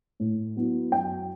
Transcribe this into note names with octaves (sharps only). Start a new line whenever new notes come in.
A2
F#3 B3 E4
F#2 G5